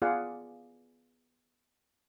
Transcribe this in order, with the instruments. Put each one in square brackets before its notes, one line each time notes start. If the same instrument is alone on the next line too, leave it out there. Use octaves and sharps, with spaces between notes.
[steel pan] B3 F4 G#4 D5 F5 F#5